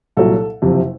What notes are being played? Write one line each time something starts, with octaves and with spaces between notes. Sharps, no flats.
C2 A#2 F#3 A4
F#1 F2 C3